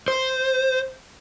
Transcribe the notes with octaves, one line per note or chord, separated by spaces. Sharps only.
C5